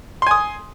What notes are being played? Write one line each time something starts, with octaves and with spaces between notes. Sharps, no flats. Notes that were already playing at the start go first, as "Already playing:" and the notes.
G#5 C6 D#6